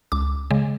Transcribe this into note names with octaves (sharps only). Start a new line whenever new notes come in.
C#2 D6
C#3 G#3